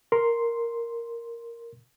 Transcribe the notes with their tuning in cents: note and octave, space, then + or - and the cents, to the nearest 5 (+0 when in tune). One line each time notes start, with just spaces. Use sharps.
A#4 +0 C6 +0